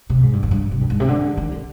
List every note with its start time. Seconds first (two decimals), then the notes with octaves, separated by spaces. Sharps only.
0.10 C3
0.23 G#2
0.33 G2
0.43 F2
0.51 G2
0.71 C3
0.81 G2
0.90 G#2
1.00 C3
1.08 D3
1.37 D#3
1.52 D3